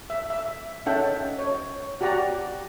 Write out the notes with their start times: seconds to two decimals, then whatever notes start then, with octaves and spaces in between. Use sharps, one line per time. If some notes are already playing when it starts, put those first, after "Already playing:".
0.10 E5
0.30 E5
0.86 C#4 D#4 A4 E5 F#5 G5
1.39 C#5
2.01 F#4 G4 D5 F#5 A#5